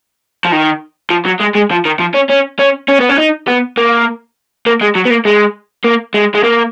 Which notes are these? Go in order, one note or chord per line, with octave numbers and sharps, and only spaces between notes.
F3
D#3
F3
F#3
G#3
G#3
F3
D#3
F3
C#4
C#4
C#4
C#4
B3
C#4
D#4
B3
A#3
A#3
G#3
F#3
B3
A#3
G#3
A#3
G#3
G#3
A#3